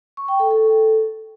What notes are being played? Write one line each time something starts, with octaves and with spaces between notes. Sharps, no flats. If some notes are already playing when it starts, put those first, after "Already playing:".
C#6
G5
A4
A4